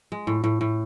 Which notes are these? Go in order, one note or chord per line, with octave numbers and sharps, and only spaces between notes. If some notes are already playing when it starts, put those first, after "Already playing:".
G#3
A2
A2
A2